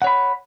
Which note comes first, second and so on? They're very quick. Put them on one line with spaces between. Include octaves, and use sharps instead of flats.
F#5 C#5 B5